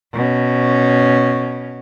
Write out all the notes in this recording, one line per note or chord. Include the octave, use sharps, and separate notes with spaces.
B2 C#4